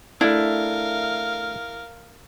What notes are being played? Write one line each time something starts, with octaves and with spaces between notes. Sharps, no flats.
A3 D4 E4 A#4 F5